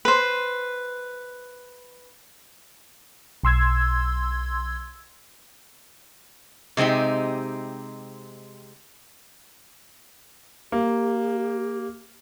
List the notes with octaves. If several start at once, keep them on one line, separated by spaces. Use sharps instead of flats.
B4 C5
B1 C6 E6 G#6
C3 G#3 C4 D#4 G4
A#3 G4